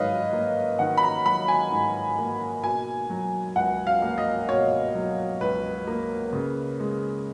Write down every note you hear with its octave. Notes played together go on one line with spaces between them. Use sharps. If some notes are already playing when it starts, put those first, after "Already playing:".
Already playing: G#2 D#3 F#3 B4 C#5 D#5 F5
A#3
D#3 F#5
B5
A#5
F#3 B5
G#5
G#2
A#3
B2 G#5
F#3
C#2 F#5
F5
A#3
D#5
B2 C#5
F#3
C#2 B4
A#3
C#3
G#3